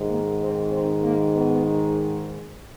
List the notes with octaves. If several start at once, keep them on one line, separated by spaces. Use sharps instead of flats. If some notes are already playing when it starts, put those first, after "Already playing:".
Already playing: G#2 D#3
A#3
C4
C4
A#3
B3